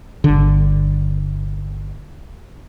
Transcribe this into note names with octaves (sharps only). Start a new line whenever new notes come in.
G1 D3